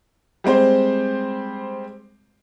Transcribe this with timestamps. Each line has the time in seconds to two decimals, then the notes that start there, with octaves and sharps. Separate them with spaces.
0.44 G3 G#3 C4 C5